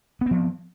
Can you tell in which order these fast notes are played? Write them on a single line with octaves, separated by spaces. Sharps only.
B3 C4 F3